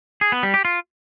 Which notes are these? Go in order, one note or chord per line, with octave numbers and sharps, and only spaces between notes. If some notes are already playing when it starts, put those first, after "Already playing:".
G#4
B3
G3
G4
F4